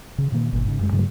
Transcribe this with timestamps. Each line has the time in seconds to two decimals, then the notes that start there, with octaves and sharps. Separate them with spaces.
0.18 C#3
0.32 A#2 D#3 A#3
0.53 G1 A#2
0.65 G#2 C#3
0.81 F#2 G#3
0.92 G2 C#3 F#3 A3